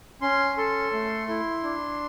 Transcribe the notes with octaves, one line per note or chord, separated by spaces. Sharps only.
C#4 C6
A4 C6
A3
E4
D4